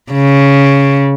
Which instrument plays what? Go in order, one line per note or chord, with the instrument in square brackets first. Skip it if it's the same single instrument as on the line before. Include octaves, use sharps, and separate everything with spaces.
[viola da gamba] C#3